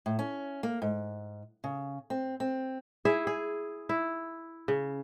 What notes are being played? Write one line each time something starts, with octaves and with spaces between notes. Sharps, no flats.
A2
C#4
A#3
G#2
C#3
C4
C4
E4 G#4 E5
G#4
E4
C#3